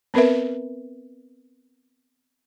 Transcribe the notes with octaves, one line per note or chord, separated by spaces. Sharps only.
B3 C4 A#4 B4 E5